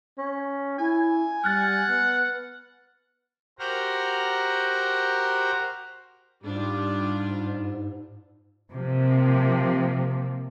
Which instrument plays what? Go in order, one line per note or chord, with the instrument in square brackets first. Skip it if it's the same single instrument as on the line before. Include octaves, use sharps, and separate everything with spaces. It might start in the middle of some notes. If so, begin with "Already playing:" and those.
[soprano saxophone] C#4
[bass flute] E4 [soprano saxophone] G#5
[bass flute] G3 [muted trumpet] F#5 [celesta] F6 F#6 A6
[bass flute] B3
[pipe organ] F#4 G4 A#4 C5 F#5 A#5
[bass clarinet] G#2 [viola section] G3 D4 F4
[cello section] C3 F3 A#3